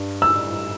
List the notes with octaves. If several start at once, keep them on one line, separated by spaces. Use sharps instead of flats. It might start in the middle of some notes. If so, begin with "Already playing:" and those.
Already playing: G2
E6